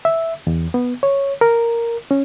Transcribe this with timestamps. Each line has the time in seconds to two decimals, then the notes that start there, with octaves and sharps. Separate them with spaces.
0.05 E5
0.47 E2
0.74 B3
1.03 C#5
1.41 A#4
2.11 C#4